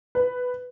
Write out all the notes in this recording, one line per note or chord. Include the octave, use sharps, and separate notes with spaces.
B4